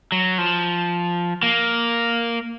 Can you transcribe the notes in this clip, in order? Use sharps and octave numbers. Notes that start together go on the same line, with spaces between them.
F#3
F3
A#3